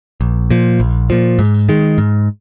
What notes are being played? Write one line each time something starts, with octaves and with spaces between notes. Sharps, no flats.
A#1
A#2 F3
A#1
A#2 F3
G#2
D#3 G#3
G#2